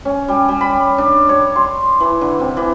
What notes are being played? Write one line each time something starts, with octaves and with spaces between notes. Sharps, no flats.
C#4
G3
G3
B5
D4
C#5
C6
E3
D3
C3
E3